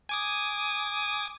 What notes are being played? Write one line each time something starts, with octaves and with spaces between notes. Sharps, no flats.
G#5 D6 D#6